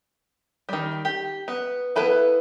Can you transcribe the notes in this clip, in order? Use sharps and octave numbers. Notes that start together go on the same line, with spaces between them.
D#3 G3
G4
B3
B3 E4 A4 B4 F5